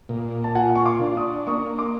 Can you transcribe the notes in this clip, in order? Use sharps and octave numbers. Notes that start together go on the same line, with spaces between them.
A#2
A5
F4 F#5 G#5
C#6
C6 D6
D4
C#6 D#6
A#3 C#6 D#6
C6 D6